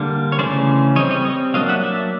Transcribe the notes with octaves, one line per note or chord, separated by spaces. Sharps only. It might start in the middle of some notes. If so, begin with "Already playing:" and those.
Already playing: D3 G3 A#3
C#5
C#3 E3 A3 C#4 C5 D5
G3 C4 C#5 D#5
C#5 D#5
C#5 D#5
F#3 A#3 D4 D#5 F5
E5 F#5
D5 E5